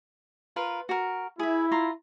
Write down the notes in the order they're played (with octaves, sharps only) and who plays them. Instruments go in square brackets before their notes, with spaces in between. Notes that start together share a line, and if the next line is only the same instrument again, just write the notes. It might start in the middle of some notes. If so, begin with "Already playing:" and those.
[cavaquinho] F4 A#4 B4
F#4 A#4
[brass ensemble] E4 [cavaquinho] G#4 E5
[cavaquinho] F4 A#5 C6